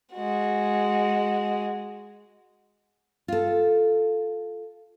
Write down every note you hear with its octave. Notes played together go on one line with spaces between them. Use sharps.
G#3 F#4
F4 A4